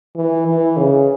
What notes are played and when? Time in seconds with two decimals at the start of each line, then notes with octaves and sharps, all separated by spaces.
0.16 E3
0.47 E3
0.77 C#3